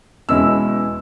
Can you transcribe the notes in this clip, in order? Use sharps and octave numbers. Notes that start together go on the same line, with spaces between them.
E2 B2 G#3 C#4 E4 E6